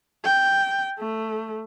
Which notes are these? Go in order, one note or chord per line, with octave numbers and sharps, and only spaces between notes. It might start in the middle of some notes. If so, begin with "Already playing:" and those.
G5
A3